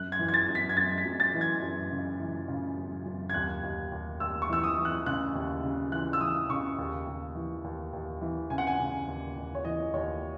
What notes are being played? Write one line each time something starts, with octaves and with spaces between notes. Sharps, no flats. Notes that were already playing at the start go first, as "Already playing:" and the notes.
Already playing: F#2 F#6
G#6
E3
G#6
A6
F#2
B6
G#6
F#2 A6
B6
F#2
A6
E3
G#6
F#2
C#3
E3
C#3
F#2
F#2
G#6
D#2 F#6
D#2
D#2
D#2 E6
C#6
E3 E6
D#6
E3
F#6
C#3 F#6
D#2
C#3
E3 F#6
E6
E3 D#6
C#3 C#6
D#2
D#2
E3
D#2
D#2
E3
C#3 G#5
F#5
G#5
C#3
D#2
D#2
C#5
E3 D#5
D#2 C#5